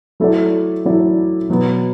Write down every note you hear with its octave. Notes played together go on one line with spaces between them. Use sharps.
F#3 A3 E4 A4 D5
F#3 A3 E4 A4 D5
B2 F#3 B3